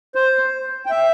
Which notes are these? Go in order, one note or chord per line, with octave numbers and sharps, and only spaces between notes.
C5
G5
E5